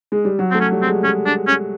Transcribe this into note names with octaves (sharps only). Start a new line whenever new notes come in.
G#3
G3
F#3
A3 C4
C#4
G3
C4
G#3
G#3 C#4
D4
C#4